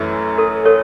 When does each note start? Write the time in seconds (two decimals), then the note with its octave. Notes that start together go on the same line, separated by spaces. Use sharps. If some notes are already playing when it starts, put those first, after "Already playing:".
Already playing: F#2 E3 A3 C#4 E4
0.38 A4
0.65 A4 C#5